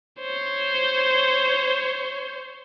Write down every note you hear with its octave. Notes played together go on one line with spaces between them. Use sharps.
C5 C#5